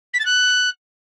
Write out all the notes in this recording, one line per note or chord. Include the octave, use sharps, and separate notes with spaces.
B6
A6
F#6